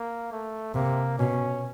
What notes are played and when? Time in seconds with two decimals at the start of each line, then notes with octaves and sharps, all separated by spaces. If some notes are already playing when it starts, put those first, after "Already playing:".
Already playing: A#3
0.32 A3
0.74 C3 A#3
1.19 B2 C#4